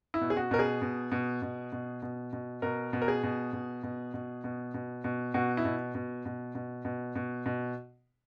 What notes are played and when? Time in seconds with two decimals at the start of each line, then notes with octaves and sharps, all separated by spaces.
0.14 E4
0.21 B2
0.30 G#4
0.37 F#4
0.51 B2 A#4
0.59 G#4
0.82 B2
1.12 B2
1.42 B2
1.72 B2
2.02 B2
2.33 B2
2.62 B2 A#4
2.93 B2
3.02 A#4
3.08 G#4
3.23 B2
3.53 B2
3.83 B2
4.14 B2
4.44 B2
4.74 B2
5.04 B2
5.34 B2 F#4
5.57 E4
5.65 B2
5.95 B2
6.26 B2
6.55 B2
6.85 B2
7.15 B2
7.46 B2